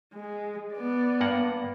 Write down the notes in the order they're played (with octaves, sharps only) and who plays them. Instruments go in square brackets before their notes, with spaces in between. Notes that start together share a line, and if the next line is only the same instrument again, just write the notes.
[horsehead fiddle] G#3
B3 D5
[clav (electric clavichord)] G2 A#3 F#5